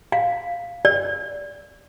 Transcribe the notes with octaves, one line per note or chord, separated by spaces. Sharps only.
F5
D5